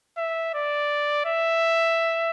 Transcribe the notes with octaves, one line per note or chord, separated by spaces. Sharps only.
E5
D5
E5